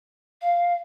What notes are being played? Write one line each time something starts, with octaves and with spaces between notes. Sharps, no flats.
F5